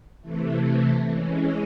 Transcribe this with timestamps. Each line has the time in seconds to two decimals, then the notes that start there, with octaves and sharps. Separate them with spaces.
0.21 C3 E3 A3
1.08 E3 G#3 C#4